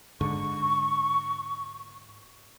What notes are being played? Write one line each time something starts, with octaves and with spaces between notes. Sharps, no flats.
G#2 D3 C#6